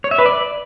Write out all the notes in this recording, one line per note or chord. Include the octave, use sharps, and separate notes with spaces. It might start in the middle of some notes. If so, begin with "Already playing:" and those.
C#5
E5
B4
D5